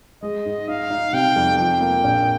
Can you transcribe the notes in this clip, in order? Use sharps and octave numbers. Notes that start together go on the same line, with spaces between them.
G#3 D#5
G#2
D#4 F5
D#4
C3 G5
F2
F3 G5
A#3
A#1